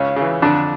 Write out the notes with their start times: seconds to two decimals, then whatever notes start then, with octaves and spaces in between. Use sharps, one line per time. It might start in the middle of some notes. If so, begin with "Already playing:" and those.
Already playing: C#2 C#4
0.16 C#3 E3
0.42 F2 D3 D4